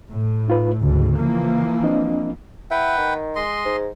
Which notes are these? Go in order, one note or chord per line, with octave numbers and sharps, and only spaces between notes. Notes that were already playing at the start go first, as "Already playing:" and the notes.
A2
D#4 F4 B4
D2 G#2 C#3
E3 F3 A#3
C4 D4 D#5
E4 B4 F#5 G5
D#3
G#3 D#5 C6
G#2